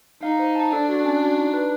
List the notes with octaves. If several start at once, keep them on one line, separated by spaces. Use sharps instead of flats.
D#4 F5
C5
A5
D4 A4
F#4
C#4
F#4
D#4
B4